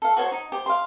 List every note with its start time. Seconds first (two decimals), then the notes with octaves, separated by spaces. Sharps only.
0.02 A4 F5
0.17 F#4 C5 C#5 C#6
0.32 D#4
0.52 G4 C5
0.66 F5 C6